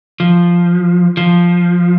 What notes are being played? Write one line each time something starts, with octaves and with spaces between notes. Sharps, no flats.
F3
F3